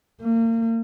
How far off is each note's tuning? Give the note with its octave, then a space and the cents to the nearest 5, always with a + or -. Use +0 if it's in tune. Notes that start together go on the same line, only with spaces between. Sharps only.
A#3 -35